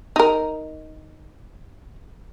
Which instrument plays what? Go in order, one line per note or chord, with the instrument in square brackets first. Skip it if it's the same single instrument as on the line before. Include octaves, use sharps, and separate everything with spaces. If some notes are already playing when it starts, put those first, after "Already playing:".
[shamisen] D#4 A#4